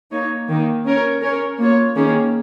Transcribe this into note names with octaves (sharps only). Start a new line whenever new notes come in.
A#3 D#4 C#5
D#3 A#3 D#4
C#4 A#4 C#5
C#4 A#4 C#5
A#3 F4 C#5
D#3 A#3 C#4 G#4